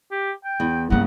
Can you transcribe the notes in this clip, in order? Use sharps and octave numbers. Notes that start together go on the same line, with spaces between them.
G4
G5
E2
G2 C#3 F3 A#3 F#5